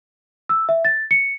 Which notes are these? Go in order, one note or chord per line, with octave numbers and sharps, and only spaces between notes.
E6
E5
A6
C#7